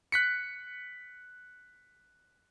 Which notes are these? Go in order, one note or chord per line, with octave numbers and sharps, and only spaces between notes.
F#6 B6 C#7